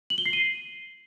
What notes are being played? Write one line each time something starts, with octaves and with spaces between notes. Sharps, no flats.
F#7
G7
C7
D#7